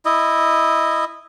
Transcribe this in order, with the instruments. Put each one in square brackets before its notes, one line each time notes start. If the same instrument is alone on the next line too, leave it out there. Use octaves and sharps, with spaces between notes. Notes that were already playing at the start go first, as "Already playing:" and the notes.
[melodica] E4 D#5